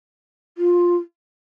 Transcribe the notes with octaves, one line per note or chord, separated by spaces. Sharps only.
F4